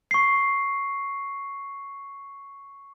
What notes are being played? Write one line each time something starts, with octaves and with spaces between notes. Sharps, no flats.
C#6 C7